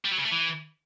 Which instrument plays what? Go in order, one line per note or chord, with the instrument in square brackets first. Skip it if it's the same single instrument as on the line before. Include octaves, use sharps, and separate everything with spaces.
[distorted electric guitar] G3
F#3
C#3
A3
E3